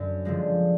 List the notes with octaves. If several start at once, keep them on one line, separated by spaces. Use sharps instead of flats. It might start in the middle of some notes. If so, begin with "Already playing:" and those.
Already playing: F#2 D3
D3 F3 G#3